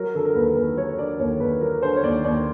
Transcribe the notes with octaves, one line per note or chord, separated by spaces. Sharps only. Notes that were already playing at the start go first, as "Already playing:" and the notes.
Already playing: F#3 A#4
D3 A4
A#4
D#2 B4
D#2 B4
F#3 C#5
C#5
D3 D5
D#2 C#5
D#2 B4
F#3 A#4
D3 C5
C#5
D#2 D5
D#2 D5